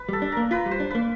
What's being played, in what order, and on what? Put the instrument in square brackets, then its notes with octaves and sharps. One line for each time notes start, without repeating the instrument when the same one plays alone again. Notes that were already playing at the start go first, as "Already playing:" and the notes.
Already playing: [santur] B4
[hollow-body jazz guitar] G3 [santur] A4
[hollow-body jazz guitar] D4
[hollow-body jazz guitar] A#3 [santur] A#4
[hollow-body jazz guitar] F4 [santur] B4
[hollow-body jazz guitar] G3
[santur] C5
[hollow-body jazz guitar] D4
[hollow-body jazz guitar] A#3 [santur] B4